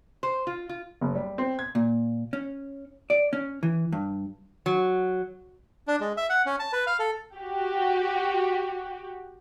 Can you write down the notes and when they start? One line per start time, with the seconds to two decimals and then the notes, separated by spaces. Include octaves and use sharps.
0.23 C5
0.47 F4
0.69 F4
1.01 F#1
1.15 G3
1.38 C4
1.59 G#6
1.75 A#2
2.33 C#4
3.10 D5
3.33 C#4
3.63 E3
3.92 G2
4.66 F#3
5.87 D4
6.00 G#3
6.17 E5
6.30 F#5
6.46 C#4
6.59 A5
6.73 B4
6.87 F5
6.99 A4
7.35 F#4 G4